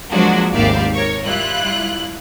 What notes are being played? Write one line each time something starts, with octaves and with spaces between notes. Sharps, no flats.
F3 F#3 G#3 A#3 D4 F#4
G#1 D#2 G4 D5 E5 F5
A#4 C#5 C#6
G3 E4 F4 F#6